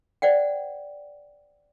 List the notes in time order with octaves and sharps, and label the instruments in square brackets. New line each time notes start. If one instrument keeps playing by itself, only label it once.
[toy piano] C5 D5 F#5 G5